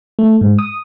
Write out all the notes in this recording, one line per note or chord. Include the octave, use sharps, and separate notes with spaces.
A3
G#2
D#6